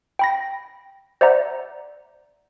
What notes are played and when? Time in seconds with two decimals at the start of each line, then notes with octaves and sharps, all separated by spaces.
0.19 G5 B5 A#6
1.21 C5 D5 E5 F#5 A#5